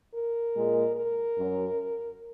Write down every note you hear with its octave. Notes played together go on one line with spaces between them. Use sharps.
A#4
A#2 G#3
A#4
F#2 F#3